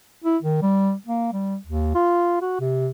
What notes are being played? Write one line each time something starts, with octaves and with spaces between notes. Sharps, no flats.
E4
D#3
G3
A#3
G3
D#2
F4
F#4
C3